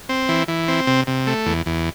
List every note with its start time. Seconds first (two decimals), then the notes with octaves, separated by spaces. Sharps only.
0.09 C4
0.29 E3
0.48 E3
0.68 C4
0.87 C3
1.07 C3
1.27 A3
1.46 E2
1.66 E2